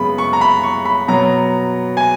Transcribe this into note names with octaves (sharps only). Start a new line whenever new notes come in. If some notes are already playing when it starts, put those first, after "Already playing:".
Already playing: F#2 C#3 G#3 B3 B5
C#6
A#5
B5
C#6
B5
B2 F#3 B3 A#5
G#5